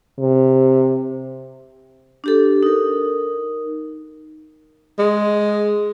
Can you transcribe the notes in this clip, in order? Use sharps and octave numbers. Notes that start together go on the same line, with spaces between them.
C3
D4 G4 A4
D#4 A#4
G#3